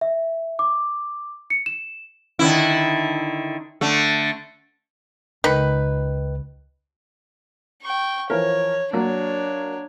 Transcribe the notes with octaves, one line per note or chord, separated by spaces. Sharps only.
E5
D6
C#7
E7
D3 D#3 E4
D3 A3
C#2 D#3 B4
G5 C#6
E3 F3 A#4 C#5
F#3 A#3 D4 C#5